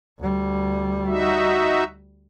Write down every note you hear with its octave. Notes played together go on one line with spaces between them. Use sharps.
D2 G3
D#4 F#4 E5